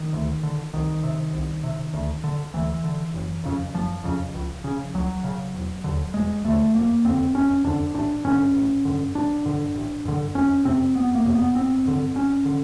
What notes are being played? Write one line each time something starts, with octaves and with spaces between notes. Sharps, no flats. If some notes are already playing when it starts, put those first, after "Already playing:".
Already playing: D#3
D2
D3
C2 D#3
C3
C2
C3
D2
D3
D2 E3
D3
F#1
F2 C#3
F#1 F3
F2 C#3
C#2
C#3
C#2 F#3
C#3
E1
D#2 D3
E1 G#3
D#2 D3 A3
F1 A#3
F2 D3 C4
F1 C#4
F2 D3 D4
A1 D4
G2 D3 C#4
A1
G2 D3
A1 D4
G2 D3
A1
G2 D3
F1 C#4
F2 C3 C4
F1 B3
A#3
F2 C3
B3
G1 C4
G2 D3
G1 C#4
D3